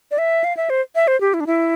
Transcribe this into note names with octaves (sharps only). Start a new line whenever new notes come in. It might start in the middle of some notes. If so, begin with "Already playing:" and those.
D5
E5
F5
E5
C5
E5
C5
G4
E4
D4
E4